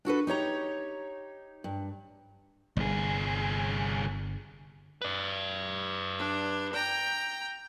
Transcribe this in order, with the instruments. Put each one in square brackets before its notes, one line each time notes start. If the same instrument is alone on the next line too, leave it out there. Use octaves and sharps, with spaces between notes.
[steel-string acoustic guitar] D4 F#4 A4 B4
D#4 G4 C#5 A#5
G2
[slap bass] G1 [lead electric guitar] C2 G#4
[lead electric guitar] B4 D5
[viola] D4
G5 A#5